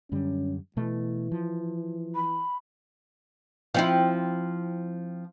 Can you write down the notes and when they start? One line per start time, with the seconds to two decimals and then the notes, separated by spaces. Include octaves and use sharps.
0.12 F#2 D3 G3 C#4
0.77 B2 E3 A3
1.32 F3
2.15 B5
3.74 F3 C4 E4